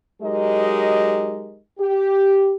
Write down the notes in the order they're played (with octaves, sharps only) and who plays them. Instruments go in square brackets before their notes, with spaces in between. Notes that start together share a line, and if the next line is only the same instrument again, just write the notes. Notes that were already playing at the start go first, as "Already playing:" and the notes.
[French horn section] F#3 G#3 D#4 G4 A#4 D#5
G4